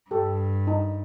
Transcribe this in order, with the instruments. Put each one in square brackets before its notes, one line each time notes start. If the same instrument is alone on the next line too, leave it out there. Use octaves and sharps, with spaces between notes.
[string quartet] G2 [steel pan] G4 A4
[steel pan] D#4